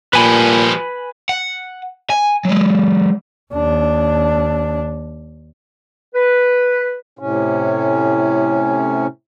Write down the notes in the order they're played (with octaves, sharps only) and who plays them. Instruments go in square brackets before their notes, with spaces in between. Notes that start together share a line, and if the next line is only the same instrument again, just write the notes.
[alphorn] A#2 [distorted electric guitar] F3 G3 [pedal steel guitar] B4 G#5 B5
[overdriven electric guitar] F#5
G#5
F#3 G#3
[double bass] D#2 D4
[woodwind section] B4
[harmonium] A2 C3 C#4